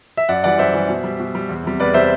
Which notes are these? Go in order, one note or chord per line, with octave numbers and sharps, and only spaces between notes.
E5
F#2 D5 F#5
E3 G3 D5 F#5
F#2 C5 E5
E3 G3
B2
G3
B2
G3
E2
C3 G3
E2 B4 D5
C3 G3 C5 E5